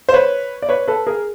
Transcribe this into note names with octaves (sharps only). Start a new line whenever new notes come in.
C5
B4 C#5
D5
B4 C#5
A4 B4
G#4 A#4